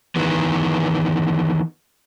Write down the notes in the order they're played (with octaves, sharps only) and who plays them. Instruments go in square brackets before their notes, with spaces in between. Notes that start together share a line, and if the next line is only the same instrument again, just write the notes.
[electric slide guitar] D#3 E3 B3